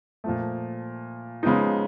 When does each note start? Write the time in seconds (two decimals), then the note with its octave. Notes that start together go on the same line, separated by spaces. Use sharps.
0.24 A#2 F3 A3
1.43 C#3 F3 G#3 B3 D#4